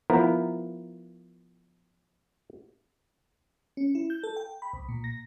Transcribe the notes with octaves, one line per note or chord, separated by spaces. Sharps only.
F3 B3 E4 A#4 A#5
C#4
E4
G6
A4
G5
B5
C2
A#2
A#6